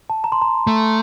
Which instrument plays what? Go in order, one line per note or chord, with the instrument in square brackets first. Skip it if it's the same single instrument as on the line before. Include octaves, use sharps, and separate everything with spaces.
[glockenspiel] A5
A#5
C6
A#5
[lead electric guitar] A3